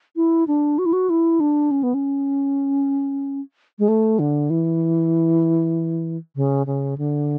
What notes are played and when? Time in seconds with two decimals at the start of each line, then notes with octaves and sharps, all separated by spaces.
0.16 E4
0.47 D4
0.78 F#4
0.86 E4
0.93 F#4
1.10 E4
1.40 D4
1.71 C#4
1.83 B3
1.94 C#4
3.79 G#3
3.88 A3
4.19 D3
4.50 E3
6.36 C#3
6.67 C#3
6.98 D3